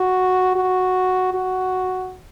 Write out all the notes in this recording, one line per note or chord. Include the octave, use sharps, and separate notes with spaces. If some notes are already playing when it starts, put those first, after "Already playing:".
Already playing: F#4
F#4
F#4